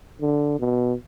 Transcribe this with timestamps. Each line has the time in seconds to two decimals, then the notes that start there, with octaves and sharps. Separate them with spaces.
0.21 D3
0.59 B2